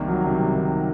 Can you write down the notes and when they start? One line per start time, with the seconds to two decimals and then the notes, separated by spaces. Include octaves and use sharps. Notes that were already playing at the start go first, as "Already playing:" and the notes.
Already playing: C2 D#3 A#3
0.08 F#3
0.24 C3
0.39 C2
0.55 D#3